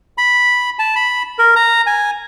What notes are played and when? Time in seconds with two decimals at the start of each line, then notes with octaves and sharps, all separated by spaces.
0.18 B5
0.79 A5
0.95 B5
1.39 A#4
1.56 A#5
1.87 G#5